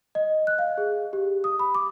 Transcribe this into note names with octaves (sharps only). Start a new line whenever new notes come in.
D#5
F#6
F5
G#4
G4
D#6
B5
D6